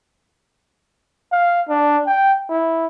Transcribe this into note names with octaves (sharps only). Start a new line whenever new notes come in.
F5
D4
G5
E4